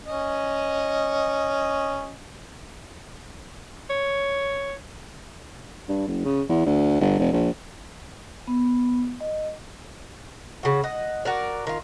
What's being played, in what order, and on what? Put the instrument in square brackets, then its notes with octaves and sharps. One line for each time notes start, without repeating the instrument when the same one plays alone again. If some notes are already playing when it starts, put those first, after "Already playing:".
[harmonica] C#4 D#5
[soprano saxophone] C#5
[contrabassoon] G2
F#1
C#3
E2
D2
G1
F1
A#1
[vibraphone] B3
D#5
[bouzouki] C#3 F#4
D#5 F#5
F#4 A#4 D5
D#3 F4